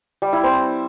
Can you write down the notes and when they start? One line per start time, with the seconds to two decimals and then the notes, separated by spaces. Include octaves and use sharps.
0.22 G3
0.33 E4
0.44 C4